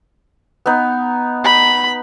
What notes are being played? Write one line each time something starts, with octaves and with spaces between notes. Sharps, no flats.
B3 D#4
B5